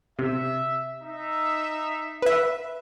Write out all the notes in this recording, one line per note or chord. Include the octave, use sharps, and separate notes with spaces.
C3 E5
D#4 E5
B4 E5